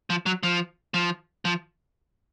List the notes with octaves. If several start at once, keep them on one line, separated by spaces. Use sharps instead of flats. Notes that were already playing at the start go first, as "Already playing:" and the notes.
F3
F#3
F3
F3
F3